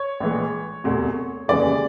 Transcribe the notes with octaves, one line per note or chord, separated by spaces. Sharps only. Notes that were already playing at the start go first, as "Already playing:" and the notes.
Already playing: C#5
A#1 A2 E3 G#3
E1 D2 C3
F1 D#2 C#3 E3 G#3 D5